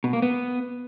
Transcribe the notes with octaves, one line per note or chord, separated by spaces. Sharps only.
B2
A#3
B3